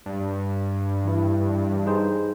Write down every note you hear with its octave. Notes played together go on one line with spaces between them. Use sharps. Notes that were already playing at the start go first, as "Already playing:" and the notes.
G2
E3 E4
D#4 G#4 C5